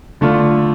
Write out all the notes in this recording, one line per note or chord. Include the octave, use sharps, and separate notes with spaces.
D3 A3 D4 F4